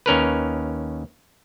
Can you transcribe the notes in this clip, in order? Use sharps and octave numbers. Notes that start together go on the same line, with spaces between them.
D#2 C#4 A#4 B4